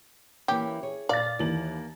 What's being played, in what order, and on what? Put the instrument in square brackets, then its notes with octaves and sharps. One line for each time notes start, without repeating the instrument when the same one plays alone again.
[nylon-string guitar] E3 A#3 C#4 [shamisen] G4
[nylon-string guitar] G#4 C#5
[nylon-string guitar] A#2 [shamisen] D5 [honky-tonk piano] F5 A6
[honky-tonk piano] D#2 E3 F#7 [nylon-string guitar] A#3